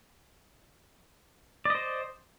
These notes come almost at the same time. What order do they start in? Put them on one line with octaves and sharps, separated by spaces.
D5 D#5 C5